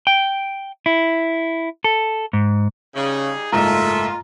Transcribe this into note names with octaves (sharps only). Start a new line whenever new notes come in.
G5
E4
A4
G#2
C#3 G3 D#4 G#4
F#1 G#2 A3 F4 A4 E5 A#5